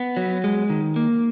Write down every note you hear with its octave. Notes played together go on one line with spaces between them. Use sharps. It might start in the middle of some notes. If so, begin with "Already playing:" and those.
Already playing: B3
F#3
G#3
D#3
A#3